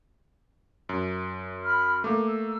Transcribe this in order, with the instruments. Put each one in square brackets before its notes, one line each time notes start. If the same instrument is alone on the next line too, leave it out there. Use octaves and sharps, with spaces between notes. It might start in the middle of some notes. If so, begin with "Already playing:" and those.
[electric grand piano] F#2
[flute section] B5 F6
[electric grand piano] A3 A#3 [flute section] D6
[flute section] E6